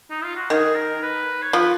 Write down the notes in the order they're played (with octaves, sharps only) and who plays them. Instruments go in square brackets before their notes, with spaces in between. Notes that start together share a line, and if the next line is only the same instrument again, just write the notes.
[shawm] D#4
F4
F#4
[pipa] D#3 [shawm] G#4
[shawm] A#4
B4
C#5
[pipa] F3 [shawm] B4